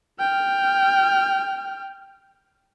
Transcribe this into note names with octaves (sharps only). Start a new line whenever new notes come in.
G5 F6